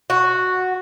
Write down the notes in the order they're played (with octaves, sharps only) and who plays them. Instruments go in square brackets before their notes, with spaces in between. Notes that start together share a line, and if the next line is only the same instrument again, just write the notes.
[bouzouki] F#4